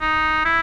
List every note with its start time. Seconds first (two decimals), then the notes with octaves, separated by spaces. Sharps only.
0.01 D#4
0.45 E4